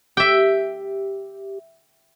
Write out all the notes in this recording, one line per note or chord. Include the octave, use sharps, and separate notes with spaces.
G4 E5 G5